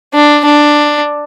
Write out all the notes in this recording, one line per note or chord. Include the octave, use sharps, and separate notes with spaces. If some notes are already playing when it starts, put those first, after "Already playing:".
D4
D4